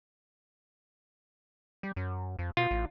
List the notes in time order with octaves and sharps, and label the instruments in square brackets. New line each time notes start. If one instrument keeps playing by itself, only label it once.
[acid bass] G3
F#2
F2
[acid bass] B2 [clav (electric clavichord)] F4
[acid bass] A1